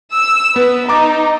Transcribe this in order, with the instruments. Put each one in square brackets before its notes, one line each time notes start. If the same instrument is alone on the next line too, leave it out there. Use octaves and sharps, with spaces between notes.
[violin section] E6
[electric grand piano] B3 [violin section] B4
[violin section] D#4 [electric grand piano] A#5 D6 A6